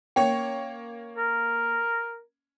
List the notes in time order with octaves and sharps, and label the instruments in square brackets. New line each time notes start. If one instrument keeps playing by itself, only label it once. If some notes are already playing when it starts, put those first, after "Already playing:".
[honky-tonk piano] A#3 C#5 [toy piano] C#4 G5
[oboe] A#4